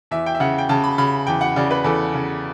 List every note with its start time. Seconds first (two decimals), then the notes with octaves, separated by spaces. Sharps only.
0.11 E2 E5
0.26 G5
0.35 E5
0.40 C#3 F#5
0.58 G5
0.69 C#3 A5
0.84 B5
0.98 C#3 B5
1.27 E2 G5
1.41 F#5
1.56 C#3 D5
1.71 B4
1.84 E2 A4
2.14 C#3